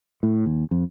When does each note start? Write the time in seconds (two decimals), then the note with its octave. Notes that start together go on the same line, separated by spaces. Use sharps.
0.23 A2
0.46 D#2
0.71 F2